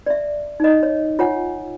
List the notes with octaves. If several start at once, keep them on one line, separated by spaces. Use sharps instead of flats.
D5 E5
D#4 D#5
C#5
F4 C#5 F#5 G#5